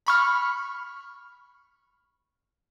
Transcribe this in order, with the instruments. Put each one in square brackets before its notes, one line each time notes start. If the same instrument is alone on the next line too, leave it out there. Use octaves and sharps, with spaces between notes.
[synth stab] B5 C#6 F6